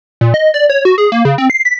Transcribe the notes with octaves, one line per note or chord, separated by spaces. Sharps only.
A#2
D#5
D5
C#5
F#4
G#4
A#3
C#3
C4
C7
B6